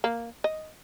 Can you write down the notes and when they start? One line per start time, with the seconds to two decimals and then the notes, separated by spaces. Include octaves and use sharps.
0.04 A#3
0.44 D#5